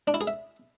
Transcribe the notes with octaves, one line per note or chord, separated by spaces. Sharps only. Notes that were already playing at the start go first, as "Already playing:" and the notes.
D4
E4
G#4
E5